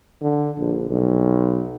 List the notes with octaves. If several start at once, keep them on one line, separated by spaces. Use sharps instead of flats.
D3
A#1
B1